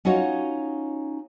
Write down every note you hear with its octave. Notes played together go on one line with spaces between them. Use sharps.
C#4 D#4 F4 F#4 C#5 D#5